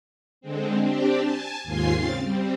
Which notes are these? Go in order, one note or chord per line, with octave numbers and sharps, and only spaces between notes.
D3 G#3 C4
C4 D4 G4
G#5 A5
D#2 G#2 F4 G#5 C6 C7
C#3 C4 F5 A6
G3 C4